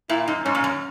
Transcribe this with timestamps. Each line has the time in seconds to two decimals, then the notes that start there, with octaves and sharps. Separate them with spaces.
0.09 A#2 E4
0.27 F#2 D#4
0.45 G#2 C#4
0.55 A#2
0.64 F#2